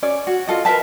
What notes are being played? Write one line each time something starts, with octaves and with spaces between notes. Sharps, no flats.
C#4 D5
F#4
F4 A4 D#5
A#4 B4 E5 A5